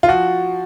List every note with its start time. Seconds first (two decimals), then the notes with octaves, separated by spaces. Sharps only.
0.03 F4
0.08 F3 F#4